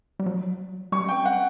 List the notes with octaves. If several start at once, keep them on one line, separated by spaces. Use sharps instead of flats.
G3
F#3
G3 C#6
G5
F#5